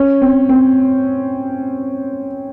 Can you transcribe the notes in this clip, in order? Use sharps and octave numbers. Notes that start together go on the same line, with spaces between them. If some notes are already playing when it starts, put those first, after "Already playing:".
Already playing: C#4
C4
C4